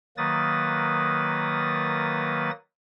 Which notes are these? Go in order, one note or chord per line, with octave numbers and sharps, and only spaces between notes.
D#3 F#3 A#3 B4 D#6 A6